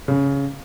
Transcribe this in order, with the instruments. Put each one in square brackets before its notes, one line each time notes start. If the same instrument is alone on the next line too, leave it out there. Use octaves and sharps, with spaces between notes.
[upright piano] C#3